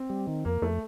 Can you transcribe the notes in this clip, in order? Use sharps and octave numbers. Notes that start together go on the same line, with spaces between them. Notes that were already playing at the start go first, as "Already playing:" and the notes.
Already playing: C4
G3
D#3
F2 A#3
F2 A3